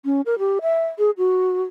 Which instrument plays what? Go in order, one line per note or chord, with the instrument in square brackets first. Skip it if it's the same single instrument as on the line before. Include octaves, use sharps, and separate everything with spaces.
[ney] C#4
A#4
G4
E5
G#4
F#4